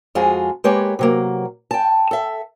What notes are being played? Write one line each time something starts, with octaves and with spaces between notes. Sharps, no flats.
F2 G#3 F4 F#4 G#4
G#3 A#3 G4 B4 C#5
C3 F#3 A#3
G5 A5
A4 E5